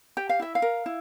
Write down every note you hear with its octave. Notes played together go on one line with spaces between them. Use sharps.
G4 G5
F5
E4 E5
F5
A#4
E4